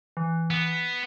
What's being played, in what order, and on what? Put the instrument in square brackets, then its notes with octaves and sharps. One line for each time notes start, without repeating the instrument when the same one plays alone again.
[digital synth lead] E3
[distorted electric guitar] B3